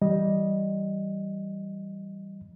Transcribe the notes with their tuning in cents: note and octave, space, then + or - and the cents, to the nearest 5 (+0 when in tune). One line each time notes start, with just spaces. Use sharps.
E3 +0 G3 -10 D#5 +0